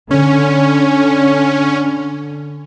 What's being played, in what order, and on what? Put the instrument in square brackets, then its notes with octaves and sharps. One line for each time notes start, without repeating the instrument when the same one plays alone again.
[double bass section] D3 [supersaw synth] C#4